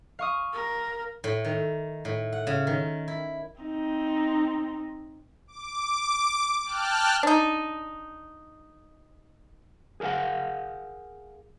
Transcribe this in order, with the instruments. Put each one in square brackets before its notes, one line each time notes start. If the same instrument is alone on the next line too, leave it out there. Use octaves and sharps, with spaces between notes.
[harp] F5 C#6 D#6
[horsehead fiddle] A#4
[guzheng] A2
D#3
A2
F#5
C#3
D#3
E4
[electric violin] C4 D#4
[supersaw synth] D6
G5 A5 F6 F#6
[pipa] D4 D#4
[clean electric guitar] G#4 A#4 C5 F5 F#5